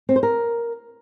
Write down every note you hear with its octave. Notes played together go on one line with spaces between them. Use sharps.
C4
C5
A#4